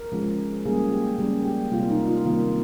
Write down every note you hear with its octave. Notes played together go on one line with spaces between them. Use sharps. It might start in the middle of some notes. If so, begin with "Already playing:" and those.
Already playing: A#4
C#3 F3 G#3
C#3 G3 A#3 G#4
G4
C#3 G3 A#3 G4
G4
C3 G3 A#3 F4
D#4
F4
C3 D#3 G3 A#3 F4